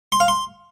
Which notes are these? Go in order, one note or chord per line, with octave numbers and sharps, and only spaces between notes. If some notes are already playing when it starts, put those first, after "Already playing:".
C6
F5
C6